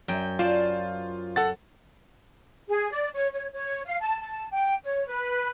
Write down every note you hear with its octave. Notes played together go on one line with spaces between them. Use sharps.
F#2 G5
F4 C5 D5 A5
A4 F#5 A6
G#4
D5
C#5
C#5
C#5
F5
A5
A5
G5
C#5
B4